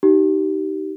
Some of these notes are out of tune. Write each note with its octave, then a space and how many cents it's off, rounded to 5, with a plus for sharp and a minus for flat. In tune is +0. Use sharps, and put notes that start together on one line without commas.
D#4 +0 G4 -30